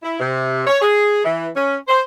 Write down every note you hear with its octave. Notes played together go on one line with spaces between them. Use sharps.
E4
C3
C#5
G#4
E3
C#4
C5